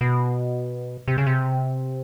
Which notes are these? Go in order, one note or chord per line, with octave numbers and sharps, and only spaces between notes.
B2
C3
C#3
C3